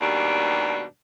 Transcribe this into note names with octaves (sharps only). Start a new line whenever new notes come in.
D#2 G#2 B2 G3 D4